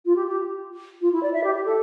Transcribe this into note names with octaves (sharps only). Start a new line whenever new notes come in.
F4
G4
G4
F4
E4
D5
E5
G4
G4
A4